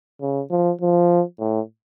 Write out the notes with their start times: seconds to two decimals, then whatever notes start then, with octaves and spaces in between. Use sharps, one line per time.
0.21 C#3
0.51 F3
0.81 F3
1.40 A2